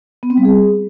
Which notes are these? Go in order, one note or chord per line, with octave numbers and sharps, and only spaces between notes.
B3
C4
G3
G#4